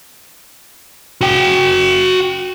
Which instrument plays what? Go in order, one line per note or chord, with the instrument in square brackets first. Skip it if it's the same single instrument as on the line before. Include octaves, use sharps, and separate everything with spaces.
[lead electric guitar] F#4 G5